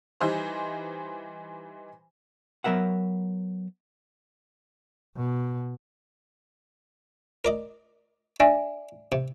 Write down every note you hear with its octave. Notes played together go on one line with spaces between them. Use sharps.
E3 G3 D#4 C5
F#3 B3 A#4 E5 F#5
B2
A#4 D5 D#5
D4 D5 E5 G#5
C3